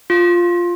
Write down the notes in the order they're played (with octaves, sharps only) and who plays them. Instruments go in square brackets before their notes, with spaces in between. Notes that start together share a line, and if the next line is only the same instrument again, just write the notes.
[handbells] F4